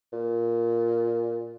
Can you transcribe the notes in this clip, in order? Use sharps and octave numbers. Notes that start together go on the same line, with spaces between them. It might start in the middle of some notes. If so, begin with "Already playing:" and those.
A#2